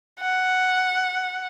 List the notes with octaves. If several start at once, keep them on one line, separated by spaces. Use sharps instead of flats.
F#5